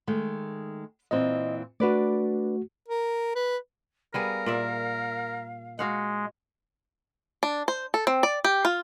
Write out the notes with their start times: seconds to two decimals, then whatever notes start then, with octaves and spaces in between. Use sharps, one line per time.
0.07 D#3 G#3 A3
1.11 A#2 E3 C4 D#5
1.80 A3 D4 F#4 B4 D5
2.88 A#4
3.35 B4
4.14 G3 B3 G#4 A#4 F5
4.46 A#2 D5 E5
5.79 G#3 F#4 F5 F#5
7.43 D4
7.68 C5
7.94 A4
8.07 C4
8.23 D5
8.45 G4
8.65 F4